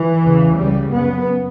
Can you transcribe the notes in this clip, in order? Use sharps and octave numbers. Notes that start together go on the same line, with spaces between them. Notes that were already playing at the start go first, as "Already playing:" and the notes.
Already playing: E3
E2 C#3
C#2 C#3 G3
F#2 C#3 B3